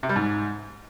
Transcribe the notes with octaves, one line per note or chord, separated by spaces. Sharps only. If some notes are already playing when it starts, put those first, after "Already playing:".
C3
G3
G#2